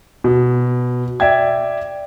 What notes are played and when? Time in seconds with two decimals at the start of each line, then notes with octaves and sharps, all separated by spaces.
0.24 B2
1.20 D5 E5 G5 G#6